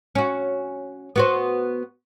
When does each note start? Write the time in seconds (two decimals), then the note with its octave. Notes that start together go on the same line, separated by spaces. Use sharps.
0.15 C#4 F#4
1.16 B3 F#4 C5